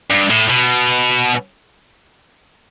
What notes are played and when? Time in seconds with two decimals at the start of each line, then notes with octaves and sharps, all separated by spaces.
0.11 G2
0.30 A2
0.50 B2